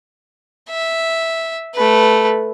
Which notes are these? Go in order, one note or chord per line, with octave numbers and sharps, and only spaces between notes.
E5
A3 B4